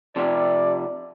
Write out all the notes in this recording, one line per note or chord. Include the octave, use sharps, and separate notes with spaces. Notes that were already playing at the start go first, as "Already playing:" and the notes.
C3 F3 D5